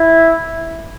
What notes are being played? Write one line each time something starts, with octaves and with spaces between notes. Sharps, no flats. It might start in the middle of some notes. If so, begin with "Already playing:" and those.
Already playing: E4